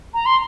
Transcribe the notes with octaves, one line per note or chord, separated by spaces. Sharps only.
A#5
C6